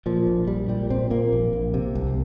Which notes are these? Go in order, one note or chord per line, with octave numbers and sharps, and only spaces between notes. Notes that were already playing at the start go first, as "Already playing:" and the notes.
A#2 F3
A#1
A#1 G3
A#2 G3
A#2 C4
A#2 A#3
A#1
A#1
C3
C2